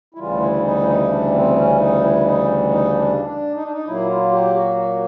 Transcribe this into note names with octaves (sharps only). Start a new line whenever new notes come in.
E4
D2 C#3 E3 G3 F4
E4
D#4
E4
D#4
D4
C4
C#4
D#4
E4
D#4
D#4
D4
D4
D#4
D4
D#4
A#2 F#3 A#3 E4
F4
G4
F#4
F#4